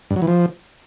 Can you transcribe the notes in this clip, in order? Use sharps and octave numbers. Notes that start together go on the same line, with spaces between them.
G2
F#3
E3
F3